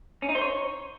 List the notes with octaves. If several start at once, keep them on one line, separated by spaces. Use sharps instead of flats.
C#4
D#4
C5
C#5